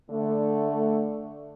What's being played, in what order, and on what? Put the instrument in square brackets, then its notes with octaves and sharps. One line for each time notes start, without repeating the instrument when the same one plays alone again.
[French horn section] D3 A3